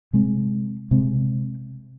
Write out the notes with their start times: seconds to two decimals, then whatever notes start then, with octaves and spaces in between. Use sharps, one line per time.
0.13 C3 G#3 C4
0.91 C3 G#3 C4